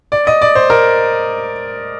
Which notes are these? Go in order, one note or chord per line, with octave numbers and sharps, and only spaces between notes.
D5
D#5
D5
C5
A#4